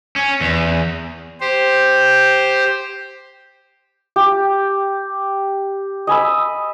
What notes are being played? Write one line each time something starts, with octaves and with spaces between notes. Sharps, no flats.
C#4
E2
G4 C5
G4
D#5 G#5 B5 E6